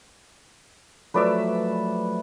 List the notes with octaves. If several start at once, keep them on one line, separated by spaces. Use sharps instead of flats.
F3 F#3 A3 B4 D5 E5